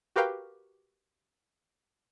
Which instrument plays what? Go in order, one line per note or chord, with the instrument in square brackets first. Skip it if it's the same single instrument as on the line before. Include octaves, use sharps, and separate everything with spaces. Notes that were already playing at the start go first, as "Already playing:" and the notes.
[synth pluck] F#4 G4 A#4 B4 F5 G5